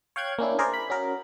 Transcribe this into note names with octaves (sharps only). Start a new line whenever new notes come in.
C#5 F5 G5 F#6 G#6
A#3 C#4 D4 E4
G#4 A#4 C5 D5
B5
C#4 F#4 A#4